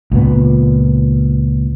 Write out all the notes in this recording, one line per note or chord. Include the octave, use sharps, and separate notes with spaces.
C#2 A#2 B3